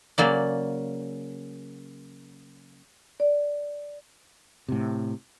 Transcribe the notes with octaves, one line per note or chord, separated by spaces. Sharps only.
C#3 F#3 A#3 D5
D5
A2 C3